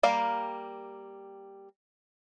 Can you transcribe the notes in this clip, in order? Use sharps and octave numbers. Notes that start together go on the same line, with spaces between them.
G3 A#3 A#4 F5